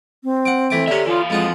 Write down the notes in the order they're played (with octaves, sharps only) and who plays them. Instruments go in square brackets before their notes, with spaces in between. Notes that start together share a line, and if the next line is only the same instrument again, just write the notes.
[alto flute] C4
[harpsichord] F#5 D6
E3 A3 D6
[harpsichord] D3 C#4 [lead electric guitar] G4 E5
[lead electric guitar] E3 F5 [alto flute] F4
[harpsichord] F2 F4 F#5 [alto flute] G#3